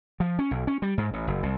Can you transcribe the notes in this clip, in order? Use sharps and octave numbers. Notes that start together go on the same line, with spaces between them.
F3
C#4
B1
C#4
G3
G#2
A1
F#1
C2